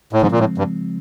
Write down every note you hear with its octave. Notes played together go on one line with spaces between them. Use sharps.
A2
G#2 C#3 F3 G#3 C4
A#2
A2
G2